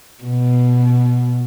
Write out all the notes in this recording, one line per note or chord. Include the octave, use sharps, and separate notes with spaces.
B2